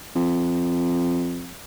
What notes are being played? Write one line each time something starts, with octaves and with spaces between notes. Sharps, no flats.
F2